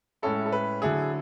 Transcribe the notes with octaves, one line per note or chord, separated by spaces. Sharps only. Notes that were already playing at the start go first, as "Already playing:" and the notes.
A2 G#3 C#4 E4 A4
A4
B4
D3 F#3 A3 E4 G#4